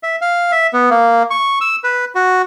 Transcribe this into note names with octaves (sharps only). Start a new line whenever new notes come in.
E5
F5
E5
B3
A#3
C#6
E6
B4
F#4